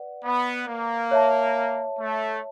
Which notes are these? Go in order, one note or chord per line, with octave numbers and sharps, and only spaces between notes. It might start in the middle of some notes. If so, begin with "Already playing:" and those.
Already playing: B4 D5 F#5
B3
A#3
C#5 E5 A5
A3